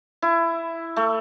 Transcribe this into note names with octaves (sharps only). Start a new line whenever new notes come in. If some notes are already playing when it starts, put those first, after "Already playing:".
E4
A3